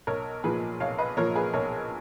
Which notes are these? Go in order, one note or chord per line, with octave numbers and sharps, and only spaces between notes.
B1 A#4 C#5
A#2 F3 G#4 B4
B1 C#5 F5
B4 D#5
A#2 F3 A#4 C#5
G#4 B4
B1 A#4 C#5